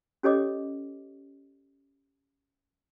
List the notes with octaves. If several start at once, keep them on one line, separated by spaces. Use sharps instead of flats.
C#4 G4 A4 C#5 D#5 D6